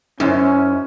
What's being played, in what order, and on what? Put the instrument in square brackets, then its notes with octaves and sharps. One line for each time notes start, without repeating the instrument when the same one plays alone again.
[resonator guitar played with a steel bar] F#2 [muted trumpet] C#4 [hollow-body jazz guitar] D#4 E4 C5